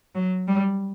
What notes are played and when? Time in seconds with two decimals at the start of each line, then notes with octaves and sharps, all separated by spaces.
0.15 F#3
0.48 G3